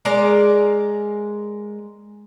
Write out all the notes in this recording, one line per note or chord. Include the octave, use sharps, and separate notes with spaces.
G#3 A#4 D5 A#5